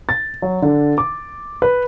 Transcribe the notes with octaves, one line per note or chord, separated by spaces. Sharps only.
A6
F#3
D3
D6
B4